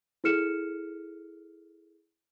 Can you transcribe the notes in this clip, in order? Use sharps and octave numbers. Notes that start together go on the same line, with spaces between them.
E4 G#4 A4 F6 C#7 E7